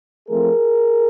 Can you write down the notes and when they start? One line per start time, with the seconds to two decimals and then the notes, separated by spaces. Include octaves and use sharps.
0.29 F3 A3 C4 G#4 A#4